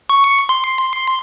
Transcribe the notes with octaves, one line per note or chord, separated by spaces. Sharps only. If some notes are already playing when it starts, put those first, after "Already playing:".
C#6
C6